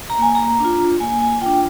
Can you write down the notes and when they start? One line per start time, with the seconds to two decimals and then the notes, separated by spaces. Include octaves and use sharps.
0.10 A#5
0.18 A#3 G#5
0.35 A#5
0.60 D4 F4
1.00 A#3 G#5
1.20 G#5
1.41 D4 F4 G5